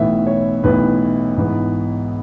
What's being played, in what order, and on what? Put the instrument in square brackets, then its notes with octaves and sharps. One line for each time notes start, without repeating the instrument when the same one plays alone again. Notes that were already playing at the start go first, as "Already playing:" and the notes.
Already playing: [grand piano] B1 A2 E3 B3 E5
C#5
B1 A2 E3 B3 B4
G#2 E3 B3